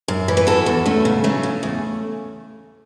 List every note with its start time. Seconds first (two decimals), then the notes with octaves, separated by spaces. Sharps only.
0.08 F#2
0.28 E3
0.37 B4
0.47 E2 F#4 A4
0.66 E2
0.86 E2 A3 C#4
1.05 C#3
1.24 F#3 A3 C#4
1.43 C#3
1.63 E2